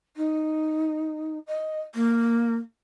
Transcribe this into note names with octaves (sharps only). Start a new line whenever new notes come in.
D#4
D#5
A#3